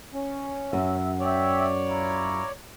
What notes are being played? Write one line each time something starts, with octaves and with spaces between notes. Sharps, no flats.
C#4
F#2 E5
C#5 D5 E5 G5
E4 F4 A#5